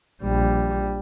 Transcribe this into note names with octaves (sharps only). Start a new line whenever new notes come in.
A#1 G3